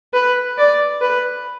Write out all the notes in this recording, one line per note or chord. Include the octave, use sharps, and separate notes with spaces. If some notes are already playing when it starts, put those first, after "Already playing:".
B4
D5
B4